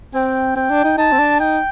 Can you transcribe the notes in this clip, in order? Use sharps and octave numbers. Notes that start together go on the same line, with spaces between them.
C4 G5
C4 G5
D4
D#4
D#4 A5
C4
D4
D#4 G5